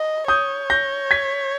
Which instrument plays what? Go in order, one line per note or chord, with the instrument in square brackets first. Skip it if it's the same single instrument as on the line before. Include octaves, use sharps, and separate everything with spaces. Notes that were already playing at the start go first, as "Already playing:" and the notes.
Already playing: [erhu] D#5
[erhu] C#5 [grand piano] D#6 G6
[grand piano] G6 A#6
G#6 B6